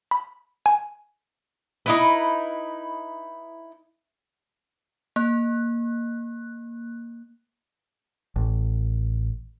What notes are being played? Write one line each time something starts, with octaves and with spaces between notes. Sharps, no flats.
B5
G#5
D#4 E4 B4
A#3 F#6
A1